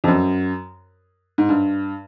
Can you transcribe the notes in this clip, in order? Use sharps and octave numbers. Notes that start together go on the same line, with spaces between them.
F2
F#2
G#2
G2